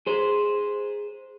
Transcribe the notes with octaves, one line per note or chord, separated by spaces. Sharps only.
G#4 C5